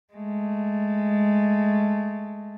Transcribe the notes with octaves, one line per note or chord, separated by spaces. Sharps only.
G#3 A3